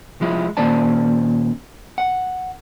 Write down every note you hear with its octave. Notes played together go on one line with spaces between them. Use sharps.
C2 F3 G#3 E4
A#2 D#3 C#4 C5 D5 A5
F#5